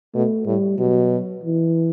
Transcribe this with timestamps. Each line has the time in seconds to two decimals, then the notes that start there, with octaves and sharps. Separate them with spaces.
0.15 B2 A3
0.46 A2 G3
0.78 B2 F#3
1.43 E3